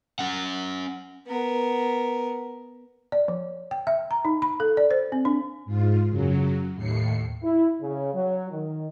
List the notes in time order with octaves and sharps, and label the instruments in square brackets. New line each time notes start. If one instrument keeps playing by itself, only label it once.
[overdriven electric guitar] C#4 F#5
[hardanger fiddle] B3 A#4
[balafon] D5
F3
G5
E5
A#5
D#4
B5
A4
D5
C5
C4
D4
[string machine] G#2 F4
F#2 C#3 F#3
D#2 A2 C7 C#7
[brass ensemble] E4
C#3
F#3
D#3